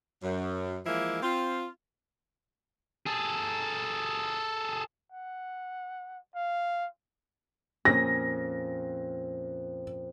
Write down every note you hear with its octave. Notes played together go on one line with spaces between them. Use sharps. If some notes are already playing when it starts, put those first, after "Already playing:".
F#2
E3 F3 G#3 A#3 E4
C4 F4
G#4 A4
F#5
F5
F2 A#2 C#4 A#6